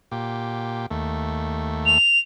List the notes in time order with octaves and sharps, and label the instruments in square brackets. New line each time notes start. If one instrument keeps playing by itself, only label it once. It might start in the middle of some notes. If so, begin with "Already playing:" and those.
[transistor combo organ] A#2 G4
D#2 A3
[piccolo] F7